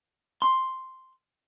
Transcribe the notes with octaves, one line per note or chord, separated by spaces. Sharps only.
C6